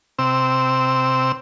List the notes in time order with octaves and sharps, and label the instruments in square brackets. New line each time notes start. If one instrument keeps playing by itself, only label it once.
[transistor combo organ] C3 C4 E6